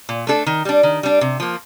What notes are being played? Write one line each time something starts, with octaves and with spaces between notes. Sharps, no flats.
A#2
A3 D4 A4
D#3
G3 D4
D#3
G3 D4
C3
F3 A#3